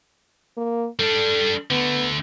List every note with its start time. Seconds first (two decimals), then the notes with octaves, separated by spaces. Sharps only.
0.57 A#3
0.99 G3 D4 A4
1.70 D3 A3 B3